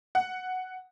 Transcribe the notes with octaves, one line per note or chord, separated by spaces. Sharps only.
F#5